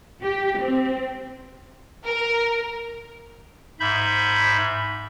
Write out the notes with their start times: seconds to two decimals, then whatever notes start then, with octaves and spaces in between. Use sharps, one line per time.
0.23 G4
0.61 C4
2.04 A#4
3.80 G#2 E5 B5 G6